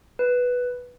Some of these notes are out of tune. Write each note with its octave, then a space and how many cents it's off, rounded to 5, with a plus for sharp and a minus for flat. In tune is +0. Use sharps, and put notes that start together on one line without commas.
B4 -5